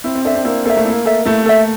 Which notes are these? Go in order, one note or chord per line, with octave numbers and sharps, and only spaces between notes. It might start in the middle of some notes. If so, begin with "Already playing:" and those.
C4 E4
C4
D4 A4 E5
C4
A#3 E4
A#3 A4 E5
A3
A#3 E4
A4 E5
A3 E4
A4 E5